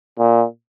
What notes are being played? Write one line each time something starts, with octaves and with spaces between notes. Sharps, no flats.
A#2